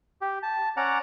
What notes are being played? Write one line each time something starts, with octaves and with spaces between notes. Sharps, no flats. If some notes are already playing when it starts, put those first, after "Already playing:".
G4
A5
C#4 D5 F#5 A#5